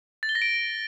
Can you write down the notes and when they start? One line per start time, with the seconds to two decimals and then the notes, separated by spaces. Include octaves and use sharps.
0.23 A6
0.29 G7
0.35 A#6
0.42 D7